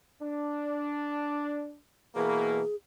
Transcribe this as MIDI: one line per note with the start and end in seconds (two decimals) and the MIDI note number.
0.21 1.79 62
2.15 2.62 47
2.15 2.62 52
2.15 2.62 58
2.15 2.75 68